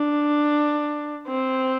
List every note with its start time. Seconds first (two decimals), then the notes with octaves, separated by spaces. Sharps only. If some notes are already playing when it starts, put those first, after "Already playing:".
Already playing: D4
1.27 C4